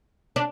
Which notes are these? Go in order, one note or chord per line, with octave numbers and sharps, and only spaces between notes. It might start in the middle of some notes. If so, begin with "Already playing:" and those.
D4